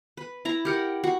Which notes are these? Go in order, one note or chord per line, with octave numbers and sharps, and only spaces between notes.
B4
E4 A#5
G4 A#4 F#5
F#4